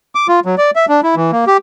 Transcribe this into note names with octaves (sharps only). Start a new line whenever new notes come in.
D6
F4
F#3
D5
E5
D4
E4
E3
A#3
G4